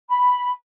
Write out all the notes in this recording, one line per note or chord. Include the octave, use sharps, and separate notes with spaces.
B5